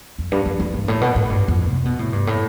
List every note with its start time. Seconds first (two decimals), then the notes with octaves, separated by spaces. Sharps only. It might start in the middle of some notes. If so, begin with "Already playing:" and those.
0.18 F2
0.32 G2
0.46 F2
0.60 F2
0.74 G2
0.88 A2
1.01 B2
1.16 A2
1.30 G2
1.48 F2
1.67 C3
1.85 B2
1.99 A2
2.13 G2
2.27 A2